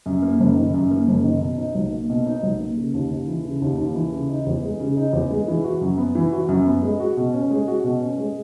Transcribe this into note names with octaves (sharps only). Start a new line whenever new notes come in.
F#2
A#3
F#1
D#3
F#2
A#3
F#1
D#3
B2
D#4
B1
A#3
B2
D#4
B1
A#3
C#3
D#2
D#2
E3
C#3
D#2
D#2
E3
C#3
D#4
E2
G#3
C#3
D#4
E2
G#3
E3
F#4
F#2
B3
E3
F#4
F#2
B3
G#3
F#4
B2
C#4
G#3
F#4
B2
C#4
G#3